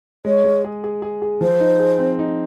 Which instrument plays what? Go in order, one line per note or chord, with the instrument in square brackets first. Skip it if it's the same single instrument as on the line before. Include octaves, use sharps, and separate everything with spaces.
[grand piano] G#3 [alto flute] C#5
[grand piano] G#3
G#4
G#4
G#4
G#4
[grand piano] F3 [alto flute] C5
[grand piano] D#4
G#4
C4
D#4